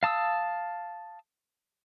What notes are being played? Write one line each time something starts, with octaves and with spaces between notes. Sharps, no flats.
F5 A5 D#6 E6